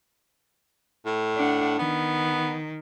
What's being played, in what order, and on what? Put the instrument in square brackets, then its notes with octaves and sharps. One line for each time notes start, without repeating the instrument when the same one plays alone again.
[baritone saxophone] A2
[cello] D4 F#5
[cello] D#3 [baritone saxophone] B3